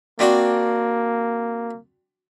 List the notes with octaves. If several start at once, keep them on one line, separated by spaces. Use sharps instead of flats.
A#3 C4 D4 F#4